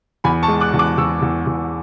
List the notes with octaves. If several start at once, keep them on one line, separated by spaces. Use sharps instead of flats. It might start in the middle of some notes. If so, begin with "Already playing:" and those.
E2 G#5 B5
A5 C#6
G#3
D6 F#6
E2
D6 F#6
E2 C#6 E6
E2
E2